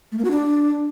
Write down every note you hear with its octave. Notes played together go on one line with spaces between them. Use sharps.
A3
A#3
F#4
D4